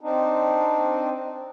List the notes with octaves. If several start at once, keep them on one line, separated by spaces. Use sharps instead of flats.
C4 D4 D#4